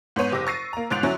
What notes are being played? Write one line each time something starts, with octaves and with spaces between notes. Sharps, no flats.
G#2 B3 C#5 D#7
F#1 G4 D6 E6 A#6
C#6 E6 A6 A#6 C7 D#7
A#3 A#5
G1 G#2 F#6 A6 D7 F7
D3 F#3 C#4 E4